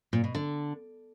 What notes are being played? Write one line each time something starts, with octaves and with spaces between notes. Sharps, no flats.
A#2
B2
D3